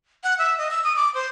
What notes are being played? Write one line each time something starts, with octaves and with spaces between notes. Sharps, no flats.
F#5
E5
D#5
E6
D#6
D6
C5